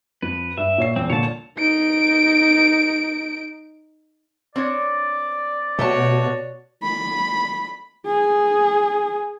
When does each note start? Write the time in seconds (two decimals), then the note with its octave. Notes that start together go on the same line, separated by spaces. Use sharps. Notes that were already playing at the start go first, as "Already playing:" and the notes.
0.22 F2 B4
0.57 G2 E5
0.78 A#2 C#5 C7
0.96 E2 C4
1.10 A#2 D3 C#5 A5
1.58 D#4 D7
4.56 C4 D4 C#5 D5
5.79 B2 A3 F#4 G4 C#5 A5
6.83 B5
8.07 G#4